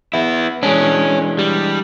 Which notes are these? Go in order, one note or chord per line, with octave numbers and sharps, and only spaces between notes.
B3 E4
E3 G#3 C#4 D4
G3